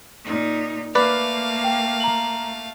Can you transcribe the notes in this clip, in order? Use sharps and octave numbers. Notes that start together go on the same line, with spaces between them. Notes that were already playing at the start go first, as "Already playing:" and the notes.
A#2 D#4
A3 A#3 B4 D5 F5
G5
A#5 F#7